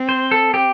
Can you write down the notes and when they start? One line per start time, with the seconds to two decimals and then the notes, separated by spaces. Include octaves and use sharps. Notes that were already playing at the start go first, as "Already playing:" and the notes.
Already playing: C4
0.09 C5
0.31 A4
0.54 G4